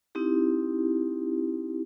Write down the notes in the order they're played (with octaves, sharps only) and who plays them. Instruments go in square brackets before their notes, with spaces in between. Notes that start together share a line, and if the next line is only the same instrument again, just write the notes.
[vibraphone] C4 D#4 E4 G4